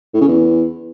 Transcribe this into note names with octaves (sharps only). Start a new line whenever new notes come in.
A2
C#3
E2